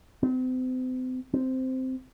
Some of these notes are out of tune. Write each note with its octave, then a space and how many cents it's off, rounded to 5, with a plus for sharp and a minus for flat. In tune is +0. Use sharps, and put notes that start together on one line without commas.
C4 -40
C4 -10